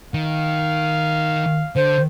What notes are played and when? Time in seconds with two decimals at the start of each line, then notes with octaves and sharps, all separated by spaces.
0.14 D#3 F5
1.76 D3 C5